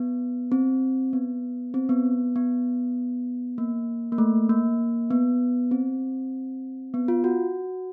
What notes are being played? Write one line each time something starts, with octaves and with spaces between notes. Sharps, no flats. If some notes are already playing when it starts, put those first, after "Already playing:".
Already playing: B3
C4
B3
C4
B3
B3
A#3
A#3
A3
A#3
B3
C4
B3
F4
F#4